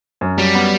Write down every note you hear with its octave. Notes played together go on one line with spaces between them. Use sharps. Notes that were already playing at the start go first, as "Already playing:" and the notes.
F#2
F#3 G3
B3